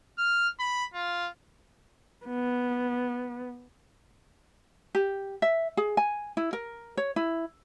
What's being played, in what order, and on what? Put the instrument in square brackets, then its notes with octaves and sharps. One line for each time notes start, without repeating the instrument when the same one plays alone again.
[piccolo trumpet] F6
B5
F4
[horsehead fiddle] B3
[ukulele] G4
E5
G#4
G#5
E4
A#4
C#5
E4